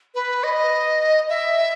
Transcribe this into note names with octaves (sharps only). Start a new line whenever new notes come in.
B4
D#5
E5